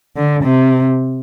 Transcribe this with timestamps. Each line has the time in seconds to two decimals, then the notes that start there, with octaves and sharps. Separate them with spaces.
0.17 D3
0.44 C3